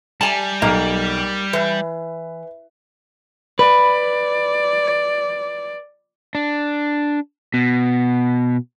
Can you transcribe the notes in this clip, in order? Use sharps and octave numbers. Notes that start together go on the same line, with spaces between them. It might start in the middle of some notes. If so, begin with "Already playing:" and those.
G3 G#5 A5
B1 A#3
E3 B4
B4 D5 B5
D4
B2